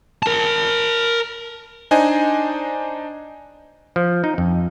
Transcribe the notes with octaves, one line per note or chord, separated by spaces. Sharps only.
A#4 A5
D4 D#4 C5 D#5 G#5
F3
D#4
F2